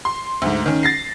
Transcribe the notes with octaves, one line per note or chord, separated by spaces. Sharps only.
C6
D2 G#2
D#3 C#4
A6 A#6 C7